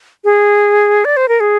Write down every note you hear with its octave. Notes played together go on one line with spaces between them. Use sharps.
G#4
D5
C5
A#4
G#4